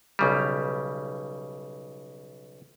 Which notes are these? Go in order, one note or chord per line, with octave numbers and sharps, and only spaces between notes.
B1 C#3 G3